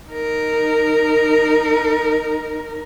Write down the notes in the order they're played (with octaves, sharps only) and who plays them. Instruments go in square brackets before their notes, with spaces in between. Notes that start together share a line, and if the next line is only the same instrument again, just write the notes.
[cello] D#4 A#4